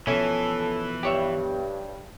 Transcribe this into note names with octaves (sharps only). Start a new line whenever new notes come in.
B2 E3 F3 C#4 A4 E5 G#5
G2 G4 C#5 E5